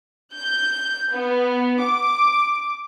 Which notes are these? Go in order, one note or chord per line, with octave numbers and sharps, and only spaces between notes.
G6
B3
D6